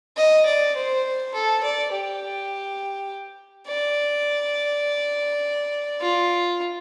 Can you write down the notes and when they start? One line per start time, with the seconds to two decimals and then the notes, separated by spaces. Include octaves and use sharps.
0.17 D#5
0.46 D5
0.76 C5
1.34 A4
1.64 D5
1.92 G4
3.67 D5
6.01 F4